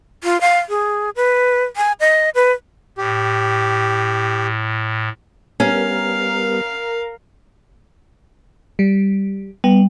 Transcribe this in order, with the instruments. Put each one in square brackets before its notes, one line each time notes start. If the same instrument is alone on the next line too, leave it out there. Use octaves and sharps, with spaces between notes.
[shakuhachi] F4
F5
G#4
B4
G#5
D#5
B4
[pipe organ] A2 [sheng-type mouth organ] G4
[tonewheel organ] G3 B3 [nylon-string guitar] C#4 [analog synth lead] A#4 [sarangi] F5
[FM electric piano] G3
[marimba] G3 [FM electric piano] B3